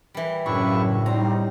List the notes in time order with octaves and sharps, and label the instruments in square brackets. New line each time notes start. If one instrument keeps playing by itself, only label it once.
[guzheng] E3 G3
[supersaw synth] F#2 C#3 [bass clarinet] A2 [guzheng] D4 [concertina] E4 C#6
[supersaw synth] G3 D#4 [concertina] C4 [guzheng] A#5